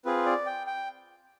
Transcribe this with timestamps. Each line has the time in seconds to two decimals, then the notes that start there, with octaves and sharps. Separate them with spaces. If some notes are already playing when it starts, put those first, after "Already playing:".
0.05 C4 F4 G#4 B4
0.26 D5
0.46 G5
0.67 G5